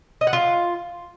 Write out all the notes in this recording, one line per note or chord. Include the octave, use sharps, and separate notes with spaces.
D#5
F#5
F4